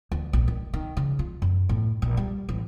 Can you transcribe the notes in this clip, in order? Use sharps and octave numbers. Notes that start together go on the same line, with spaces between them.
D2
A#1
D#3
D#3
C#3
F4
F#2
A2
A#1
G3
A1